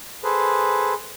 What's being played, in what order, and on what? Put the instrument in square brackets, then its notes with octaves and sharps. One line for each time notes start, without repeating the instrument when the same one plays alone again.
[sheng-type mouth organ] G#4 A4 B4 C5